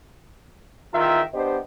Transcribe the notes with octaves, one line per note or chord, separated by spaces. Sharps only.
E2 D#3 F4 E5 G5 A#5
B3 D4 G4 C5 D#5